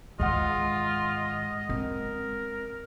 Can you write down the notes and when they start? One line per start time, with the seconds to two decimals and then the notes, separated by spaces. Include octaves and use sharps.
0.19 G#2 D#3 G#3 F4 D#5 F#5
1.69 C4 A#4